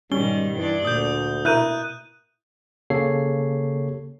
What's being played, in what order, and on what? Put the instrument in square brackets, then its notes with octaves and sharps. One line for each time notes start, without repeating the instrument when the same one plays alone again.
[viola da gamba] G#2 B2 D#3 [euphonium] G3 [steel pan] C#4 [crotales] G7
[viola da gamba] G2 D4 D5 [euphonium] E3
[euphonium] D2 [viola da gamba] A#2 [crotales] D#6 G6
[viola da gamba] B2 [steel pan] E4 A#4 [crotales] F#6 G6 D#7
[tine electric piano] C#3 A#3 G4 A4 C#5 C7